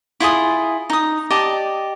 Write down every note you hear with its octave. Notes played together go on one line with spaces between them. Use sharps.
E4 F4 G#4 D#6
D#4 D#6
G4 D5 D#5 A5